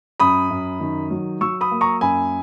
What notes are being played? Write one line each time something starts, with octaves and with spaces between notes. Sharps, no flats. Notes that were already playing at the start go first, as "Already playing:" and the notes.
F#2 B5 D#6
F#2
D#3
F#3
F#3 C#6 E6
B5 D#6
A#3
A#5 C#6
F#2 G#5 B5